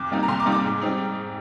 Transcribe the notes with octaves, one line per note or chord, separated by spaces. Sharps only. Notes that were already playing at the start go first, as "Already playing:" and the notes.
Already playing: F2 D6
C3 G3 A#3 D#4
A#5
F2 C6
D6
C3 G3 A#3 D#4
D6
G#2
G3 C4 D#4